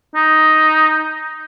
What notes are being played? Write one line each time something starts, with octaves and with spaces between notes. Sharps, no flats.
D#4